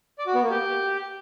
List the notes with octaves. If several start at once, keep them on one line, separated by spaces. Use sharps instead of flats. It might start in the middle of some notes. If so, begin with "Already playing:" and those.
D5
F#4
B3
A#3
G4